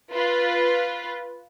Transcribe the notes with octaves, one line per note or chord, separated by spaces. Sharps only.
F4 B4